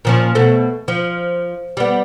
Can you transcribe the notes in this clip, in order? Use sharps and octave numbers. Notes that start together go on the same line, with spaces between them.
A#2 F3 C#4
B2 A3
F3
G3 B3